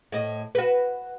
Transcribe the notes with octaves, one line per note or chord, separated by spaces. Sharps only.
A2 D#5
F#4 B4